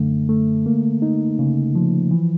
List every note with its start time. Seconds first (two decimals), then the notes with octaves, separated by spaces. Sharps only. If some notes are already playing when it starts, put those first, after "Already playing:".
Already playing: F#2 D3 A3
0.29 A3
0.66 A#3
1.02 D#4
1.39 C#3
1.75 F3
2.11 E3